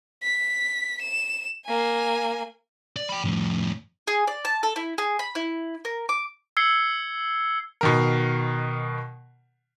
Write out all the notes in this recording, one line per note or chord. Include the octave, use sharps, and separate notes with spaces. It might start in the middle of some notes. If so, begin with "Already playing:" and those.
B6
E7
A#3 G#5
D5
G5 B5
F2 A2
G#4
D5
A5
A4
E4
G#4
B5
E4
A#4
D6
E6 G#6 C7 C#7 G7
B2 D#3 A#4